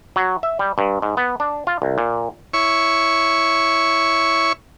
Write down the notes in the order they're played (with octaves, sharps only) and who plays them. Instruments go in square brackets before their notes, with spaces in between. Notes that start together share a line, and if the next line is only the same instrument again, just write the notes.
[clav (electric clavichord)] F#3
E5
G3
G2
G#2
B3
D4
F4
C2
A#2
[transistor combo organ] E4 C#5 C#6